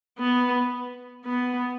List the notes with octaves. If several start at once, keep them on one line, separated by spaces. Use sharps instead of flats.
B3
B3